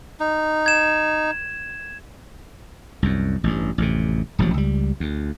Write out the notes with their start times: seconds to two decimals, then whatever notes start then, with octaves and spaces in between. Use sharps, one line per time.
0.20 D#4
0.66 G#6 E7
3.03 C2 F#2
3.44 A1 G2
3.78 A1 F2 C3
4.39 D#1 A1 F3 F#3
4.54 C#2 G3
5.00 D2